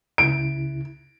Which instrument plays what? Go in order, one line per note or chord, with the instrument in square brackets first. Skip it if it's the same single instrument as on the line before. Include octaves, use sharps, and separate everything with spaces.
[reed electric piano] C#2 C#3 E4 [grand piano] D7